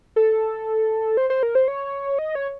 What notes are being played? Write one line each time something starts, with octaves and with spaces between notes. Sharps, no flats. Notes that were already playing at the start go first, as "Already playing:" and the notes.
A4
C5
C5
A#4
C5
C#5
D#5
C#5